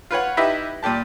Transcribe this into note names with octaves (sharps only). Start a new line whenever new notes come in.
F4 B4 C#5 F#5
D#4 E4 G4 B4 E5
A#2 G3 G4 A5